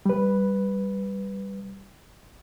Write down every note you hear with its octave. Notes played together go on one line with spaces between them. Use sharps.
G3 B4